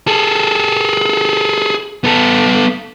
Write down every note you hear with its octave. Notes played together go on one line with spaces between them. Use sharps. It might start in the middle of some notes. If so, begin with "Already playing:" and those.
G#4 A4
B3 A4